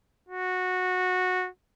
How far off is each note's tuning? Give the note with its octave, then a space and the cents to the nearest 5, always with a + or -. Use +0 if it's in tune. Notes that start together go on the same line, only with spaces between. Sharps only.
F#4 -15